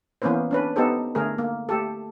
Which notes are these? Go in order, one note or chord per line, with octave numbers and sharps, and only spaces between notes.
E3 A#3 B3 C#4 B4 C5
C#4 D4 B4
B3 D#4 G4 A4 C5
D3 A3 G#4 A#4
A#3
A3 G4 A4